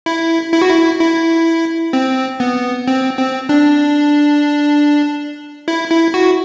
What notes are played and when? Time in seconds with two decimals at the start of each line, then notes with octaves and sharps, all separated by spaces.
0.06 E4
0.53 E4
0.62 F#4
0.70 E4
1.00 E4
1.93 C4
2.40 B3
2.87 C4
3.18 C4
3.49 D4
5.68 E4
5.91 E4
6.14 F#4